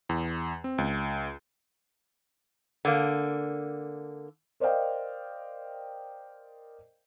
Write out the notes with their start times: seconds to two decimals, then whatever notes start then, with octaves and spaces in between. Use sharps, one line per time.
0.09 E2
0.64 C4
0.78 C#2
2.85 D3 A#3
4.60 A#4 C5 D5 D#5 F5 G5